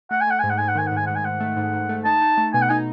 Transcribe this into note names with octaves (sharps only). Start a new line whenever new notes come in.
A3 F#5
G#5
A3 F#5
G#2 G#5
F#5
G#2 G#5
F#5
D#3 G#5
F#5
G#2 G#5
G#2 F#5
G#5
G#2 F#5
A3
G#2
G#2
A3
D#4 A5
D#4
A3
B2 G#5
F#5
D#4 G#5